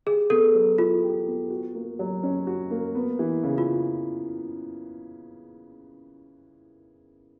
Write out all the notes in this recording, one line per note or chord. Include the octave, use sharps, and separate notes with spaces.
G4 G#4
B3 A4
F#3
E4 F4
G4
B3
F#4
A#3
F#3
C#4
F#4
A#3
B3
E3
C#3
F4